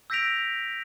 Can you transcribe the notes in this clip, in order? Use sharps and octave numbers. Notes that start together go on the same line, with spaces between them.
E6 G6 A#6 B6 D7 F7